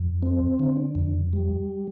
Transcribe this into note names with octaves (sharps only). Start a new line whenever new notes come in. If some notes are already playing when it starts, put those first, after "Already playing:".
Already playing: F2
C4
D3
F2
G3